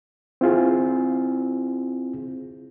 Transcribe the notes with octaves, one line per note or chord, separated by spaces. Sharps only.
C4 E4 F4 G#4